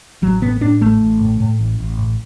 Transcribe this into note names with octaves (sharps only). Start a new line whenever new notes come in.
A1 F#3
A2 B3
A2 D4
A1 A3
A1
A2
A2
A1
A1
A2